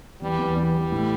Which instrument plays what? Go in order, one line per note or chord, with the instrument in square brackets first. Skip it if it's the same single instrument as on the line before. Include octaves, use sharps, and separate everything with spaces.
[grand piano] E2 [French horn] G3
[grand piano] E2
[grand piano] E2 [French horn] G3
[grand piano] E2
A2